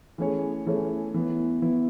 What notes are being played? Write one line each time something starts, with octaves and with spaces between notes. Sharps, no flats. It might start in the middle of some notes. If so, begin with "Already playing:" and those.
E3 A3 C#4 G#4 C#5
E3 A3 C#4 G#4 C#5
E3 B3 E4
E3 B3 E4